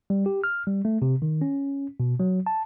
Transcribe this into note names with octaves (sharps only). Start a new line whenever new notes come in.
G3
G4
F6
G3
A3
C3
D#3
C#4
B2
F#3
A5